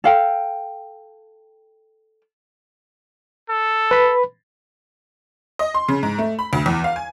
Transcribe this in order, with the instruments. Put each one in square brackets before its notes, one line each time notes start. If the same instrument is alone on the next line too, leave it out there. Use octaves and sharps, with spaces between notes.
[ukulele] A4 F5 G5
[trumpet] A4
[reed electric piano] B4 B5
[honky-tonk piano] D#5
C6
C#3
G#2
A3
B5
D2
E2
F5
G#5